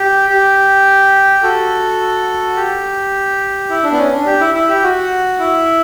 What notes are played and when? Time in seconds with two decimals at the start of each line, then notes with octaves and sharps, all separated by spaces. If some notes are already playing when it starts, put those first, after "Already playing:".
Already playing: G4
0.29 G4
1.43 F#4 A4
2.56 G4
3.70 E4
3.84 D4
3.92 B3
3.97 C#4
4.12 D4
4.26 G4
4.40 E4
4.54 E4
4.69 G4
4.83 F#4
5.39 E4